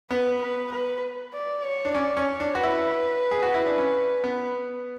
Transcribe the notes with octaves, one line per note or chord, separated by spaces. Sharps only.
B3 B4
B4
B4
D5
C#5
D4
C#4 D5
C#4
C#5
D4
F#4 B4
E4
G#4
F#4
E4
D4
C#4
B3